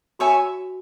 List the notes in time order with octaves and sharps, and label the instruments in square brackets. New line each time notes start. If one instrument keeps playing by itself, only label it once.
[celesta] F#4 [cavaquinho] C#5 E5 G#5 C#6